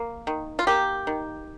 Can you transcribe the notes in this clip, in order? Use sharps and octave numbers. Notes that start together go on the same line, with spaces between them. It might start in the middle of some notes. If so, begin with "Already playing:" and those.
Already playing: A#3
D#3
F4
A#3 G4
D#3